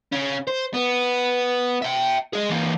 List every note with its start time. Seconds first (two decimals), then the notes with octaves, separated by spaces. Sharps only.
0.12 C#3 C#4
0.48 C5
0.74 B3
1.82 E5 G5
2.33 G#4 D#5
2.49 E3 A#3